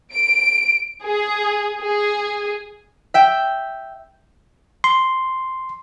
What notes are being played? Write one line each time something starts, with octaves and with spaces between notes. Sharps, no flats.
D7
G#4
G#4
E5 G5
C6